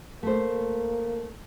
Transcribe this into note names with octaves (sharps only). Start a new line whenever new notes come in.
A3 A#3 C5